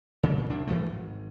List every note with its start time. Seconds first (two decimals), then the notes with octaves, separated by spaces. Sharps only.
0.23 C#3 G3
0.37 A#2
0.50 C2 D4
0.67 G#2 E3 F3 A3
0.90 G#1